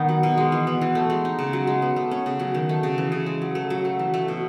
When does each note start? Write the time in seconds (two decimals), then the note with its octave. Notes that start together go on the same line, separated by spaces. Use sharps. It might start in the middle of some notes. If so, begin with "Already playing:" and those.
Already playing: D#3 B3
0.09 F#3
0.23 B2
0.37 G#3
0.52 E3
0.67 B3
0.81 E3
0.95 A3
1.10 G#3
1.25 D#4
1.39 C#3
1.53 F#3
1.67 G#3
1.82 B3
1.96 A3
2.11 C#4
2.26 C#3
2.40 F#3
2.54 D#3
2.69 A3
2.83 C#3
2.98 E3
3.12 C#3
3.26 G#3
3.42 F#3
3.55 A3
3.70 F#3
3.85 A3
3.99 E3
4.14 A3
4.28 B2